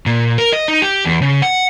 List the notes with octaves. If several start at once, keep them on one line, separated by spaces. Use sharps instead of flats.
A#2
A#4
D#5
D#4
G4
E2
C#3
F#5